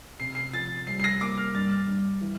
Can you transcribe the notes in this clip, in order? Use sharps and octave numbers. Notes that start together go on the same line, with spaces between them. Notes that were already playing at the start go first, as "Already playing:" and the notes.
C3 C7
C7
F3 A6
C2 C7
C7
A#6
A#3 D6
F6
G2 A6
G2
E3